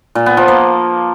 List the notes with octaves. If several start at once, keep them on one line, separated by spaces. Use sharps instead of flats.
A#2
B3
F3
A#3